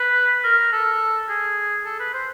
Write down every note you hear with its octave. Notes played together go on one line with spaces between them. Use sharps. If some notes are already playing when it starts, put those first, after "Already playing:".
Already playing: B4
A#4
A4
G#4
A4
B4
C5